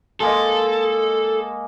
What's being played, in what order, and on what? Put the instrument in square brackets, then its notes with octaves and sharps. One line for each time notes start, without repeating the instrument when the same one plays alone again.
[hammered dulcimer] G#3 A#3 D#5 [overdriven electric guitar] A4